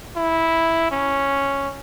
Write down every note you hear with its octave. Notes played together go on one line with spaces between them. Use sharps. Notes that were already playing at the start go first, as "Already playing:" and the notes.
E4
C#4